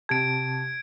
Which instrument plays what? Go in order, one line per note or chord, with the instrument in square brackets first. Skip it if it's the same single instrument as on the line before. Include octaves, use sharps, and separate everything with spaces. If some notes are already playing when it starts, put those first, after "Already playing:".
[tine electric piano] C3 G4 A5 [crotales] G#6 D7